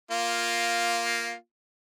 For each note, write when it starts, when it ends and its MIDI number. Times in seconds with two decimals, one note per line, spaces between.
0.11 1.34 58
0.11 1.34 65